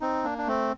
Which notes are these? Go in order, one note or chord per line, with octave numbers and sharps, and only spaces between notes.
C4 D#4
A#3 D4
D4
A3 C4